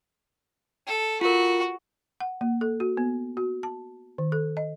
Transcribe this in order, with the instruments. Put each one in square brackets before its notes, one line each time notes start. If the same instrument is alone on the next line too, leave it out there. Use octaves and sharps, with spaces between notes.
[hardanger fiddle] A4
[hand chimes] F4 A#4 [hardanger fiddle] F#4
[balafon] F#5
A#3
A4
F#4
B3
F#4
A5
D#3
A4
D#5